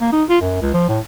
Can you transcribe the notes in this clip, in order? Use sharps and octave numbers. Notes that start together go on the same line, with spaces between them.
A#3
D#4
F4
F#2
C#2
F3
A2